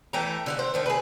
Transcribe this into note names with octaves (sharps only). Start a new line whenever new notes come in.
E3 A3 G5 A#5
D3 F5 F#5
C5
D3 D#3 A3
G#4 B4